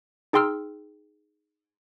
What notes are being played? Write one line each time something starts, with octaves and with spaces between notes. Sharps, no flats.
D#4 G#4 G5 C6 E6 F6